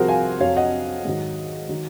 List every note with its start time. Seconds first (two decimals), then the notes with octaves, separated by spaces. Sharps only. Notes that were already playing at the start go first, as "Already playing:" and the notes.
Already playing: C2 C3 F3 F#4 G#4 A#4 C5
0.08 F5 G#5
0.40 F2 C3 F#3 C#5 F5
0.56 D#5 F#5
1.05 G#2 D#3 F#3
1.69 D#3 F#3